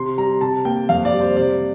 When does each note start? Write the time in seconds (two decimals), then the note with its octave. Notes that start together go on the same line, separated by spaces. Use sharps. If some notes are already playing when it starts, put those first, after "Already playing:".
Already playing: C3 C6
0.18 G3 A#5
0.41 C3 A5
0.65 A#3 G5
0.89 F2 F5
1.05 D5
1.13 G3
1.21 C5
1.37 C3 D5